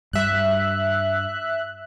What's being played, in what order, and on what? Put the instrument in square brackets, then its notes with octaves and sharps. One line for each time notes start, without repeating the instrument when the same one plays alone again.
[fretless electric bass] G2 G3 [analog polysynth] E5 F#6